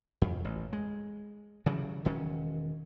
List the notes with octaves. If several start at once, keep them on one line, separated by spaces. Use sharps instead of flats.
F2
A1
G#3
C#3 E3 F#3 G3
E1 D#3 C#4